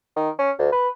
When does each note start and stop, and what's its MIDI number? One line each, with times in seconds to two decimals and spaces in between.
0.16 0.30 51
0.39 0.51 61
0.59 0.72 38
0.73 0.89 71